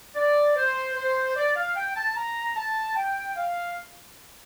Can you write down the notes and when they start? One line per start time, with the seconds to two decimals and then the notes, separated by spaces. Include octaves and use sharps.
0.15 D5
0.56 C5
0.95 C5
1.36 D5
1.56 F5
1.76 G5
1.96 A5
2.16 A#5
2.56 A5
2.96 G5
3.37 F5